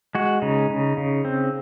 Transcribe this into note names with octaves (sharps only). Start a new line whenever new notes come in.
G#3 F#4
C#3 D#4
C#3
C#3
C4